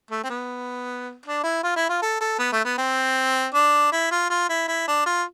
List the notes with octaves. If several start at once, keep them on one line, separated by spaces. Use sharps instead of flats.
A3
C4
B3
D4
E4
F4
E4
F4
A4
A4
B3
A3
B3
C4
D4
E4
F4
F4
E4
E4
D4
F4